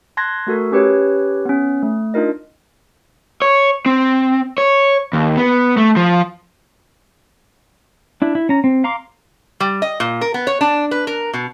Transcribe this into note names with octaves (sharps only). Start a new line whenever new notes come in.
A5 C6 F#6 G#6 A#6
A3 F#4 A4 A#4
C#4 G4 B4 C#5
B3 C#4
A3
D4 D#4 F4 A#4 D#5
C#5
C4
C#5
D#2
B3
A3
F3
D4 E4
E4
C#4 A#5
C4
F5 A#5 C6 D6
G3
D#5
A#2
A#4
B3
C#5
D4
B4
A#4
B2